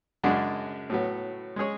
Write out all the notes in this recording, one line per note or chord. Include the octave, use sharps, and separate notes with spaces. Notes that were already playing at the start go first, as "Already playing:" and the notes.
F#2 C#3 G#3 D4 F#4
A2 F#3 B3
G#3 C#4 G#4 C#5